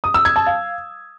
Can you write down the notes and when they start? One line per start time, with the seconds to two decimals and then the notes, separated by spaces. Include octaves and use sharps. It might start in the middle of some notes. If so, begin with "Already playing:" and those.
0.04 D#6
0.14 E6
0.25 G#6
0.36 A5
0.46 F5